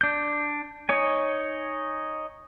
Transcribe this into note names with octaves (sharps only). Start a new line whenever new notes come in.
D4 G6
D#4 C#5 G#5